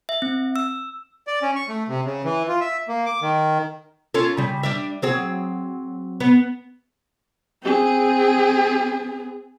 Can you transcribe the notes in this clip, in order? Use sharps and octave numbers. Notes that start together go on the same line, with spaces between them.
E5
C4
E6
D5
C#4
C#6
A3
C3
C#3
E3
F4
E5
A#3
D6
D#3
C#4 F4 A4
C#3 G3
G3 D4 E5
F#3 C4 G#4
B3
C4 G#4